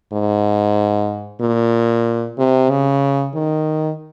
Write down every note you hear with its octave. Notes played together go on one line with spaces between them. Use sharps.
G#2
A#2
C3
C#3
D#3